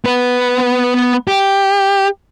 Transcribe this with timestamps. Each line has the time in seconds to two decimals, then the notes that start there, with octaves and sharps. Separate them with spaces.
0.05 B3 B4
1.28 G4